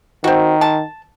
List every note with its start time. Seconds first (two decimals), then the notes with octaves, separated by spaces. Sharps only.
0.24 D#3 C4 F#4
0.61 A5